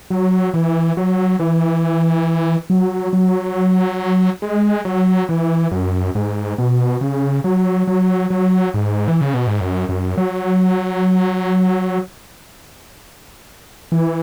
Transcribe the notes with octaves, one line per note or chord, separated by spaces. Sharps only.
F#3
E3
F#3
E3
F#3
F#3
G#3
F#3
E3
F#2
G#2
B2
C#3
F#3
F#3
F#3
G#2
E3
C#3
B2
G#2
F#2
F#2
F#3
E3